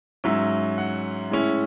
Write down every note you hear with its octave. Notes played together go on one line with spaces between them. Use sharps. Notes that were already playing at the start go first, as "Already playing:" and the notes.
G#2 F#3 C#4 E5
F#5
A2 G#3 C#4 E4